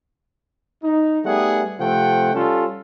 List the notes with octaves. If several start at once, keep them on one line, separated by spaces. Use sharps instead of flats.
D#4
G3 A3 B3 D#4 G#4 F#5
C3 F3 A3 C4 F#5 G5
G3 C#4 F4 A4